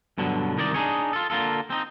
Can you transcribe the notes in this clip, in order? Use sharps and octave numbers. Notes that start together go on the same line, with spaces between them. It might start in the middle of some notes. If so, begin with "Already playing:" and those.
G2 B2 D3 F#3
C2 D#3 D#4 C#5 D5
D4 D#4 G#4 C#5
F4 A4
D3 A#3 F4 A4
C4 D#4